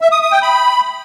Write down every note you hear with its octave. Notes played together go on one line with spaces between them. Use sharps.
E5
D#6
D#6
G5
B5